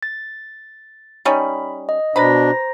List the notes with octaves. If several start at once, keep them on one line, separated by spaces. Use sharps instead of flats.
A6
G3 C#4 D#4 B5
D#5
B2 D4 B4 C5 A#5 B5 A#6